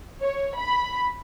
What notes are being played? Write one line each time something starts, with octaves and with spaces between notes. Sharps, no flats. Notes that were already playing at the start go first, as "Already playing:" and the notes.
C#5
B5